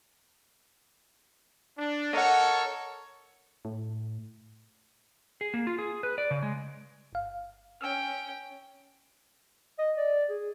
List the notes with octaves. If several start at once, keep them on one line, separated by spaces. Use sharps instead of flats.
D4
A4 A#4 C#5 D#5 F#5
A2
G#4
A#3
F4
G#4
B4
D5
C#3
G#3
G1 F5
C#4 G5 G#5 E6 F6
D#5
D5
G#4